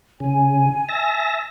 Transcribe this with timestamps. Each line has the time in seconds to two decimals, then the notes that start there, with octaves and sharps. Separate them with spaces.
0.20 C#3 G#5
0.89 E5 A5 A#6